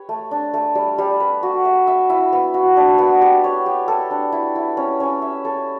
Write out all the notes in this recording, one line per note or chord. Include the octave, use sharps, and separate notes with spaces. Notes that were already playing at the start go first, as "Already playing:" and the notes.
Already playing: G4 B4 C#5
A3
D4
A3
G3
G3
B4
F#4
E5
E5
E4
B3
F#4
D4
B3
G4
C#5
G4
A4
D4
E4
E4
C#4
C#4
E5
A4